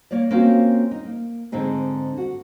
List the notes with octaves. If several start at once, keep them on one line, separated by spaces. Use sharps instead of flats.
A#3 C#5 D5
A#3 C4 C#4 F4 F#4 C5
D#4
A#3
G#2 D3 C4 D#4 G#4
F#4